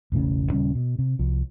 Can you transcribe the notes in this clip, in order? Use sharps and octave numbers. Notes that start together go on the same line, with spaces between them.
E1 A1 A2 C#3
D#1 C#3 G3 C#4
B2
C3
C2 F3